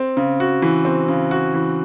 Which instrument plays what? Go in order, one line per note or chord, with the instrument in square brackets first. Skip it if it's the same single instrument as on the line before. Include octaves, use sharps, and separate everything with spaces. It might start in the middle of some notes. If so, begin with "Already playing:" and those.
Already playing: [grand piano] C4
C#3
F#4
E3
C4
C#3
F#4
E3